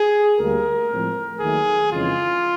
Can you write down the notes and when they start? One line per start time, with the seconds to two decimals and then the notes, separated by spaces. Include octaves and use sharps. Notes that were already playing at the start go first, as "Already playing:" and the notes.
Already playing: G#4
0.39 D2 D3 G3 A#3 A#4
0.91 A2 F3 G#3 C4
1.41 D#2 D#3 F#3 A3 G#4
1.92 F2 C#3 E3 G#3 C#4 F4